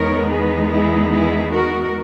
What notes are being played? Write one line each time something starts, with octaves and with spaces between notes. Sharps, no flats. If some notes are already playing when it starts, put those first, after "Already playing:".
Already playing: E2 D#3 G#3 B3 D#4 A#4 C#5
G#4 B4
E4 G#4
E4 G#4
F#4 A#4